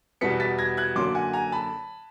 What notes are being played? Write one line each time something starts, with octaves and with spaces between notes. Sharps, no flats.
E2 B2 G3 B3 B6 C#7
A6 B6
G#6 A#6
F#6 G#6
F#2 D3 F#3 A#3 C6 D6
F#5 G#5
G#5 A#5
A5 B5